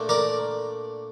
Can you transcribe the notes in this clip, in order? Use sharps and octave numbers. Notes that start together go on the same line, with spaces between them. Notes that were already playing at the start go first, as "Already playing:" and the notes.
Already playing: A#2 A3 D4
A#4 D5